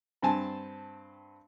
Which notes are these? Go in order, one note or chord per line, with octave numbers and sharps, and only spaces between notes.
G2 C4 G#5 A5